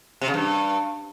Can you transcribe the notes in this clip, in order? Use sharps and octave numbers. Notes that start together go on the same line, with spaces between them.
C3
C#3
G2